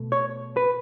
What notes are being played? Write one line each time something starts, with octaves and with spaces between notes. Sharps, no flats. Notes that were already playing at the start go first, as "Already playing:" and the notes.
Already playing: B2 A3
C#5
B4